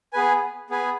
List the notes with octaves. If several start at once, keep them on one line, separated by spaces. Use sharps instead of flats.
B3 G#4 B4 G#5
B3 G#4 B4 G#5